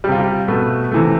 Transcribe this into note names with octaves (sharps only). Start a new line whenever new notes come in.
C3 G3 F4 G4
G4
B2 A3 B4
C3 E3 A3